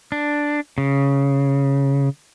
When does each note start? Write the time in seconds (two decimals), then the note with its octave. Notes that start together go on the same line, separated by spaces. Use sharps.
0.12 D4
0.78 C#3